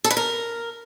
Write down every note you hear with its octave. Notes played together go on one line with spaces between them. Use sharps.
A4
B4
A#4